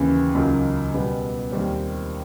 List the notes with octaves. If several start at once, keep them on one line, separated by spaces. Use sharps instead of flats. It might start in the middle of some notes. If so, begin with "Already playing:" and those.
Already playing: D#2 C#3 E3
C#2 C#3 F#3 A#3 D#4
B2 G3 B3
D#2 D#3 G3 C4